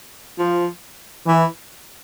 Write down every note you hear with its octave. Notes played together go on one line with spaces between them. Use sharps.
F3
E3